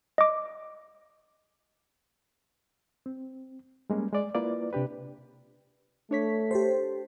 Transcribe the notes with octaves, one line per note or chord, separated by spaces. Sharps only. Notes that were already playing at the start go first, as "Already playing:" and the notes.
D#5 D6
C4
G3 G#3 A#3 C#4
G#3 D5
A#3 E4 F4 B4 D5
C3 D4 G4 B4
A3 D4 C#5 B6
G4 A4 C5